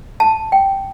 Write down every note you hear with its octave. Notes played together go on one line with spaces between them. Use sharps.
A5
G5